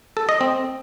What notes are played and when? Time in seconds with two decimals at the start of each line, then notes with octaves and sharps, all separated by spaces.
0.17 A4
0.29 D#5
0.41 C4